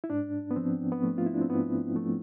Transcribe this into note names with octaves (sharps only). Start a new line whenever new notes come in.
E4
G#2 D4
B3
F3 C4
B3
F3 A3
F4
E4
D4
C4
G#2 B3
F3 A3